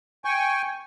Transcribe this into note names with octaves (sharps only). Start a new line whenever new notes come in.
G5 G#5 C#6